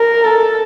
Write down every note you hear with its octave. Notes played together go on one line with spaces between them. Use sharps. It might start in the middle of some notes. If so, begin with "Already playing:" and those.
Already playing: A#4
A4